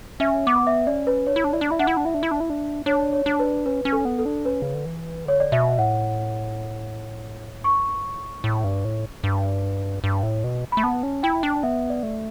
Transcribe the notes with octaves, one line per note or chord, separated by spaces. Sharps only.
C#4 E5
B3 D6
E5
C#4 D5
B4
D4 C#5
E4
D4
E4 D5
D4
E4 E5
D4 F#5
E4
D4
E4 E5
D4
E4
D4
E4
D4
D4 C#5
C#5
D4
B4
C#4 B4
C#4
A4
B3
A4
D4
C#4 B4
C#3
D3
E3
D3 C#5
D5
B2 E5
A2 F#5
G2 C#6
A2
A2
G2
A2
G2
G2
A2
B2
A3 B5
B3 A5
C#4
E4 G5
D4
B3 E5
D5
A3